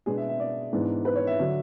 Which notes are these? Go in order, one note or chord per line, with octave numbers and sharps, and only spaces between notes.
B2 G#3 B3 D4 G#4
E5
E5
D5
G#2 E3 B3 D4
B4
C#5
E5
D3 F#3